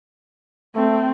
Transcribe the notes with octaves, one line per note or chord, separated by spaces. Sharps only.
A3 C4